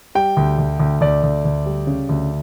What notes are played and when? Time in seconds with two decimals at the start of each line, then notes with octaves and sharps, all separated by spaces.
0.15 G3 G5
0.37 D2
0.58 D2
0.80 D2
1.01 D2 D5
1.23 D2
1.45 D2
1.66 G3
1.87 C#3
2.09 D2